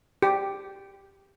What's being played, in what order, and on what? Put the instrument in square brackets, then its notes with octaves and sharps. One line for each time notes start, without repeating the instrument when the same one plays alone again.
[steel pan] G4